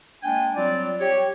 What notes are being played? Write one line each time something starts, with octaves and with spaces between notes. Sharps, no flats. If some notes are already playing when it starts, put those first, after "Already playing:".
G#3 A#3 D4 G5 G#5
F#3 G3 C4 F4 D5
G4 C#5